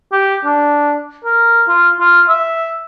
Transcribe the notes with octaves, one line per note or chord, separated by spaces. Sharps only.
G4
D4
A#4
F4
F4
E5